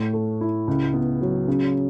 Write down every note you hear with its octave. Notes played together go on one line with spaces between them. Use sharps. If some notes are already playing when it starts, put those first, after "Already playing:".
Already playing: A2
A3
E4
C#2
B3
F#3
C#3